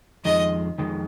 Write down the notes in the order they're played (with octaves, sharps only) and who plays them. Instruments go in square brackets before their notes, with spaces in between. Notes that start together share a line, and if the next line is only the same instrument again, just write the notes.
[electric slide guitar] F2 D#3 G#3 [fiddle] D#5
[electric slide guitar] F2 D#3 G#3